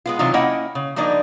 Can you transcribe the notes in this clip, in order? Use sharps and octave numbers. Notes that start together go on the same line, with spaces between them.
G#3 B3 F4
C3 E3 F#3 D#4 F4
A#3 C#4 E4 D#5 F#5 G5
C#3
F3 G3 A#3 D4 D#4